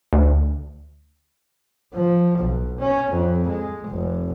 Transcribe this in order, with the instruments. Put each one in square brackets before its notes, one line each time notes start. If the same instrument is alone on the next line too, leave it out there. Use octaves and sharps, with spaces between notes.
[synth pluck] D2
[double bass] F3
B1
C#4
F2
G#3
F1